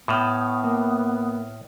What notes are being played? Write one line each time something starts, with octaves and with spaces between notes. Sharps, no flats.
A2 B3 G5 D#6 F6
A#3